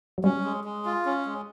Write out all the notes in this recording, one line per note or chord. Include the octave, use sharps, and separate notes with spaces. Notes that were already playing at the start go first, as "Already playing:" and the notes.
F#3
G3 C#4
G#3
G#3
F4
C#4
G#3